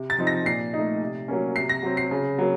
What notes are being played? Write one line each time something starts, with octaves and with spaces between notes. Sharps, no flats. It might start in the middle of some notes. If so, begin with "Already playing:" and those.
Already playing: C3
A6
F3 C4 D#4
A#6
A#2 C7
A3 D#4
C3
F#3 A#3 C#4
C3 C7
A#6
F#3 C4
C7
C#3
F#3 A#3